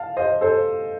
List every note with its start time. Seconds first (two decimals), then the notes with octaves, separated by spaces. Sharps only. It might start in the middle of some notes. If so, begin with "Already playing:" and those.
Already playing: F5 A5
0.17 C5 D#5
0.41 A4 C5